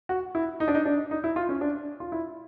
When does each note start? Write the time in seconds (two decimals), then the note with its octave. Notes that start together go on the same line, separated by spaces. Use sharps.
0.09 F#4
0.35 E4
0.60 D#4
0.68 D4
0.75 D#4
0.85 D4
1.11 D#4
1.24 E4
1.36 F4
1.49 C#4
1.61 D4
2.00 F4
2.12 E4